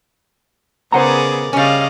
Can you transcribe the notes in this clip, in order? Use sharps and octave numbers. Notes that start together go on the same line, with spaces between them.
C#3 B3 G#4 A#4 C5 D5 F#5 A#5
C#3 G3 C#4 D5 D#5 F5